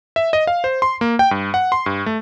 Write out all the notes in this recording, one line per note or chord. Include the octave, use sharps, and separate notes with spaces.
E5
D#5
F5
C5
C6
A#3
G5
G2
F#5
C6
G2
A3